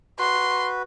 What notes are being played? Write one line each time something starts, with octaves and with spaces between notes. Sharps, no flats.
F#4 B4 C6